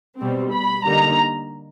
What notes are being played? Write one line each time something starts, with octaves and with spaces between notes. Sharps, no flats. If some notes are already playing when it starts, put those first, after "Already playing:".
B2 G3 C4
B5
D3 G3 A#3 D#4 A#5